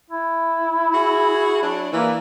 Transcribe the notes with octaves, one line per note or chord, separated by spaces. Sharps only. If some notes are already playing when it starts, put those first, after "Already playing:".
E4
F#4 G#4
F#3 D4
E3 A#3